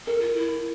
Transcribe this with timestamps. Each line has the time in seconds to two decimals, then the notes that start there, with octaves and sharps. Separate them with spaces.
0.06 A4 A#4
0.20 F4
0.34 E4